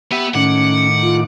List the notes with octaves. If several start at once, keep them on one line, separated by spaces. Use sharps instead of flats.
B3 G4 E5
A2 D#3 C#4 F#5 D6
F4